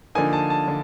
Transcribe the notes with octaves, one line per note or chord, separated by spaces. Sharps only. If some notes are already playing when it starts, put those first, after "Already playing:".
D3 F3 A#3 D#4 G#5
A5
A5
D3